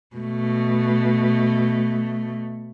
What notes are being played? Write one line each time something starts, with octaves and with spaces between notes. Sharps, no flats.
B2 A3